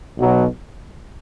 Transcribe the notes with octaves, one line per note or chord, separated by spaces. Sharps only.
B1 B2 F#3